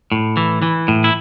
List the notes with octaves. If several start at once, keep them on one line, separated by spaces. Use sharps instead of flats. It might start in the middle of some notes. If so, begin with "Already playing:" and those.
A2
E3
E3
A2
E4